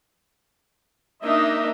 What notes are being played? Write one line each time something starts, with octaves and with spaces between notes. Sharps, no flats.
A#3 D4 D#4 D#5 E5